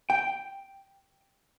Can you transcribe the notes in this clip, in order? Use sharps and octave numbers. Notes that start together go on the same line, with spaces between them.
G5